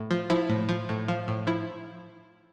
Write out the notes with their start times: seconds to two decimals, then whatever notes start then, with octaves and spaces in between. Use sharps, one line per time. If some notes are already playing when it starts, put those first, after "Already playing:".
Already playing: A2
0.11 F3
0.30 F3 E4
0.50 A2
0.69 F3
0.89 A2
1.08 F3
1.28 A2
1.47 F3 E4